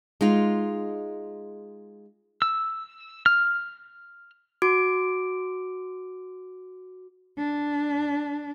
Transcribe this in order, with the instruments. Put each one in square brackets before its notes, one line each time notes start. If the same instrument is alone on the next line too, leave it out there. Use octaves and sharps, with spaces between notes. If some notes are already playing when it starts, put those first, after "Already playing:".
[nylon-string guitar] G#3 D#4 F4
[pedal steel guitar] E6
F6
[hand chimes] F#4 D6 D7
[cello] D4